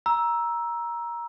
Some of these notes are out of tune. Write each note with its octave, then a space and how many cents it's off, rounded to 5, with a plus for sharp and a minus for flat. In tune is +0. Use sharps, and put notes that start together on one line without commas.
A#5 +15 E6 +0